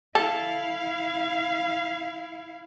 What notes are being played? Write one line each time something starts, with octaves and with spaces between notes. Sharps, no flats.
E4 A4 F5